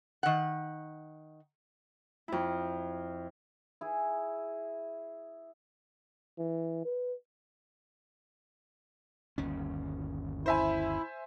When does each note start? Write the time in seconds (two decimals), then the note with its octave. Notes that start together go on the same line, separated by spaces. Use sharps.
0.23 D#3 F#5
2.28 F2 E4
3.81 E4 G#4
6.38 E3
6.86 B4
9.38 G1 D#2 C#4
10.46 E4 C5 E5 G#5